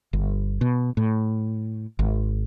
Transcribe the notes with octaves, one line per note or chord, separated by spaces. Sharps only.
G1
B2
A2
G#1